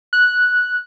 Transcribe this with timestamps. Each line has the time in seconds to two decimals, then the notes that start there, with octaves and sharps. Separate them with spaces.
0.13 F#6